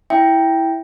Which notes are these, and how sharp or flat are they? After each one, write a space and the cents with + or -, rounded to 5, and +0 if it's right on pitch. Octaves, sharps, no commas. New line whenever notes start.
E4 +0 E5 +0 G5 +0